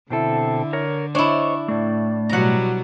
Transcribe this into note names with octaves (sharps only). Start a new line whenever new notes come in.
B2 D3 C4 E4 A4
A#4 C#5
D4 E4 C5 C#5 D#5 C#6
A2 A3 D5
B2 F#3 G3 F#5 A#5